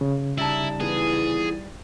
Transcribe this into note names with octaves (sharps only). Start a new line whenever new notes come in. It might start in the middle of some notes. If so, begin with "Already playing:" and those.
C#3
G3 D#4 E4 A5
E3 F3 B3 G#4